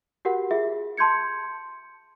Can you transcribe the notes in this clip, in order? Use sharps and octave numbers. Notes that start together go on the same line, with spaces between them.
F#4 G4 A#4 F#5
F4 G#4 E5
A5 C6 G6 G#6 C#7